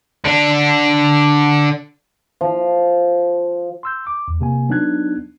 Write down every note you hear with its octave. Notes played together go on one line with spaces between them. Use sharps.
D3 D4
F3
C6 E6 G6
D6
E2
C3 A#3 G#5
F#3 B3 D4 D#4 F#6 G#6